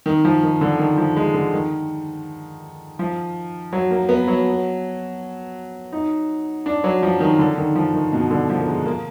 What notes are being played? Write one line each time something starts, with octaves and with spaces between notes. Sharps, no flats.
D#3
F3
D#3
D3
D#3
F3
G#3
D3
D#3
F3
F#3
A#3
B3
F#3
D#4
D4
F#3
F3
D#3
D3
D#3
F3
D#3
B2
D3
F3
A#3
G#3
A#3